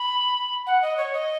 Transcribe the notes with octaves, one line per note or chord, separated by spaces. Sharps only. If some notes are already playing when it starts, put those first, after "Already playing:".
Already playing: B5
F#5
D#5
C#5
D#5